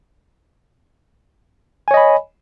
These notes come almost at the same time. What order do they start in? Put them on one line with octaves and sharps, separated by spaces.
G#5 C#5 D#5 B5